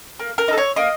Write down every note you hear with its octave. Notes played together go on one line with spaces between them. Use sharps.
A#3
A#4
D#4 A4
C#5
A#3 D#5